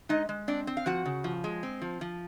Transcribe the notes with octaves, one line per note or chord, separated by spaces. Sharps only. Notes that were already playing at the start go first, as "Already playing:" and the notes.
G#3 D#4 D#5
G#3
C4 D4 D5
C4
F5
F3 F#4 F#5
C#3
F3
G#3
C4
F3
F3